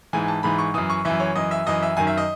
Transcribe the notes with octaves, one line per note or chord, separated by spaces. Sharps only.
G#2 E3 G#5
A5
G#2 E3 B5
C#6
F#2 E3 D#6
C#6
F#2 E3 E5
C#5
F#2 E3 D#5
E5
F#2 E3 D#5
E5
F#2 D#3 G#5
E5
D#5